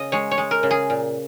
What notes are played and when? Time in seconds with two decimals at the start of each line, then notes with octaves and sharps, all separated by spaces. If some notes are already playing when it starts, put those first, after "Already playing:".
Already playing: C#3 D#5
0.12 G#3 C#5
0.31 C#5
0.38 G#3
0.51 A#4
0.63 C#3
0.71 G#4
0.90 A#2